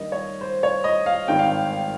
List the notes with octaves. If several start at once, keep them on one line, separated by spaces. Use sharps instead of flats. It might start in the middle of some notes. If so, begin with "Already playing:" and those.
Already playing: G2 D#3 G3 A#3 D#5
C#5
C5
C#5
D#5
F5
G#1 G2 D#3 G5
F5
G5
G5